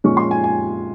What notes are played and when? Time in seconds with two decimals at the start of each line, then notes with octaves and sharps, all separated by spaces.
0.04 A#2 F3 G#3 C#4 C#6
0.17 C6
0.31 G#5
0.44 G#5